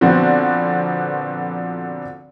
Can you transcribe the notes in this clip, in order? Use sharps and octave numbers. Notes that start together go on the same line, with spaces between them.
A#2 D3 F3 B3 C4 F#4